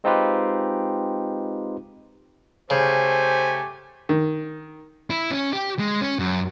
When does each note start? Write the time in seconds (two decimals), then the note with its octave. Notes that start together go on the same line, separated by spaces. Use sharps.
0.04 G#3 C4 D#4 F4 G4 B4
2.70 C#3 A3 G4 C5 G#5
4.09 D#3
5.10 E4
5.31 C#4
5.53 G4
5.79 G#3
6.01 C#4
6.19 F#2